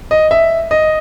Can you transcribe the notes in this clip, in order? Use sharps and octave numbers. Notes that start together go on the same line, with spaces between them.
D#5
E5
D#5